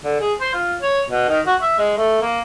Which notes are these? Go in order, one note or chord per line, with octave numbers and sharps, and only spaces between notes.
D3
G#4
C5
F4
C#5
B2
D#3
F#4
E5
G#3
A3
A#3